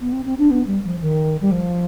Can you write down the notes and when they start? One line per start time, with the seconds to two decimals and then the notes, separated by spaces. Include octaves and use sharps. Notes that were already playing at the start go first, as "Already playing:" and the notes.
0.01 B3
0.12 C4
0.25 C4
0.38 D4
0.51 B3
0.67 G3
0.84 F3
1.01 D#3
1.41 G3
1.51 F3